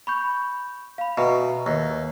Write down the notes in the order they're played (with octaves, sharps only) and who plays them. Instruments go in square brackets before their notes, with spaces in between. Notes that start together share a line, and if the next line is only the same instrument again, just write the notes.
[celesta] B5 C#6 G6
F5 B5
[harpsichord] B2 [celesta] B4 E5 A#5
[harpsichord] D#2